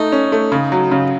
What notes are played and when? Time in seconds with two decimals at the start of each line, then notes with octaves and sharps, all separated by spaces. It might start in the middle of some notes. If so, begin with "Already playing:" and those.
Already playing: A3 D#4
0.12 C#4
0.32 A3
0.52 C#3
0.72 F#3
0.91 C#3